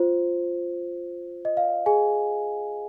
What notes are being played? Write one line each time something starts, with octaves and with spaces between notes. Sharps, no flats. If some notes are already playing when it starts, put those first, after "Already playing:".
Already playing: F4 C5
D#5
F5
G#4 G#5